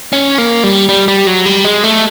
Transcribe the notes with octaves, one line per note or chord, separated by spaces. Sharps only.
C#4
A#3
G3
G3
G3
F#3
G3
G#3
A3